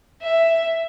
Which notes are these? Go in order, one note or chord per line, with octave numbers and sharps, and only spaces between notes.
E5